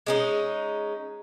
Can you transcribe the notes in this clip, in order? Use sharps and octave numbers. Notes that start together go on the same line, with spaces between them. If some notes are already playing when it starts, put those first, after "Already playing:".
G#3 C#4 D#4